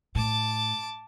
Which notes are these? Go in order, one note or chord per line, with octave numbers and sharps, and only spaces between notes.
A2 A5 D6